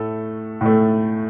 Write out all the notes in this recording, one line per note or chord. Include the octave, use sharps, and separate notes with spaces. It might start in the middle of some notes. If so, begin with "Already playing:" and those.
Already playing: A2 A3 A4
A2 A3